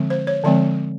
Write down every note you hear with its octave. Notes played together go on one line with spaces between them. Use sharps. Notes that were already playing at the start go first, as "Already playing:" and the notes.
Already playing: D3 F3 G#3 C4
C5
C#5
D3 F3 G#3 C4 D5